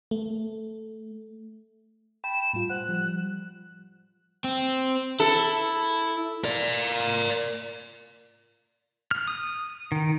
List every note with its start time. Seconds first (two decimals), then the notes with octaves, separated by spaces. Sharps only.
0.11 A3
2.24 G5 A5 B5 E7
2.53 A2 G3 F4
2.70 C5 F#5 F#6
2.89 F3 G3
4.44 C4
5.20 E4 A4
6.44 A#4 D5
9.11 F6
9.27 D#6
9.92 D#3